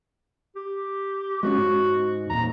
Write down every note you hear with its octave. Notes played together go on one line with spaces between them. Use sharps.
G4
G#3 A#3 C#4 F#4
G#2
E2 A#2 A#5